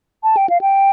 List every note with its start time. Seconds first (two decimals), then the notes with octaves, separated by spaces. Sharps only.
0.23 A5
0.37 G5
0.50 F5
0.61 G5